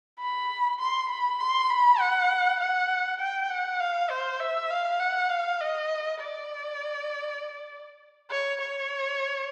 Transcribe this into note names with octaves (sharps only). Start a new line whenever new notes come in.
B5
C6
B5
C6
B5
F#5
F#5
G5
F#5
F5
C5
E5
F5
F#5
F5
D#5
D5
C#5
C#5